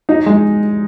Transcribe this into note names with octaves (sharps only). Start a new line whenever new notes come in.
D#4
G#3